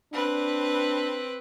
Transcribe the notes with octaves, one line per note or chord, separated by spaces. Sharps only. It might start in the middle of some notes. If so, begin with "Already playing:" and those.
C4 D4 B4